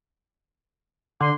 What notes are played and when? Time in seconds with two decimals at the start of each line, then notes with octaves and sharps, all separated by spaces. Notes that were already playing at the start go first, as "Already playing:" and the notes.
1.21 D3 C6